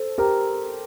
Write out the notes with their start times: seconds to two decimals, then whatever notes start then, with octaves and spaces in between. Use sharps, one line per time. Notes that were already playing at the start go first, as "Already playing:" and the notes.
Already playing: A4 C5
0.18 G4 A#4